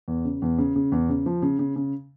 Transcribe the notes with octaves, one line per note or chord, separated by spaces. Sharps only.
E2
C#3
E2
C#3
C#3
E2
C#3
F3
C#3
C#3
C#3